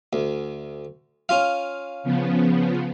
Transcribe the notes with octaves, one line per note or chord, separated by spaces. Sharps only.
D2
C#4 F4 F5
C#3 F3 B3